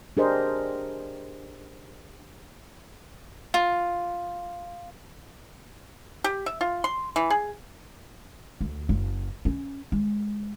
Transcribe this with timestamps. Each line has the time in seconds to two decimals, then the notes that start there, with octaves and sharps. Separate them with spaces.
0.17 D4 G4 G#4 A#4 C5 D#5
3.54 F4
6.24 G4
6.46 E5
6.61 F4
6.84 C6
7.16 E3
7.30 G#4
8.61 D2
8.89 F#1
9.45 C#4
9.92 G#3